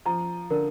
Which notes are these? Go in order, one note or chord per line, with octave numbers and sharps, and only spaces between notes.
F3 A#5
D3 A#4